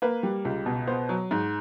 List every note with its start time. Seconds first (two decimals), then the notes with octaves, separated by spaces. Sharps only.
0.02 A#3 B4
0.23 G3
0.45 C#2
0.66 B2
0.87 B3 C5
1.09 F#3
1.31 G#2